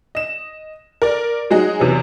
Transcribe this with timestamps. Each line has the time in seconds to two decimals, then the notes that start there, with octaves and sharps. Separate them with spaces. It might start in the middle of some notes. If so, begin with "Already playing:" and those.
0.15 D#5 E7
1.02 A#4 D5
1.50 F#3 G#3 D#4 F#4 G#4 D#5
1.80 E2 C3 E3 F#3